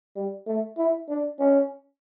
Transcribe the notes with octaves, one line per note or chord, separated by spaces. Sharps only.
G3
A3
E4
D4
C#4